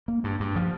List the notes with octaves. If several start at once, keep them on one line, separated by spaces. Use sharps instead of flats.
A#3
G2
G2
F3